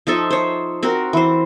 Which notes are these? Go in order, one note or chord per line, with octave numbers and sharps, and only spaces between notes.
F3 D#4 A4 E5
C5 C#5
C4 F#4 A#4
E3 C5